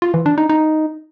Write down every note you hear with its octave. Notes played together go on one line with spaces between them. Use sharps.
F4
E3
D4
D#4
D#4